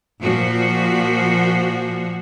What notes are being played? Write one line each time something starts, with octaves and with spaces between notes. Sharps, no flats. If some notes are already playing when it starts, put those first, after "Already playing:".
A#2 F3 F#4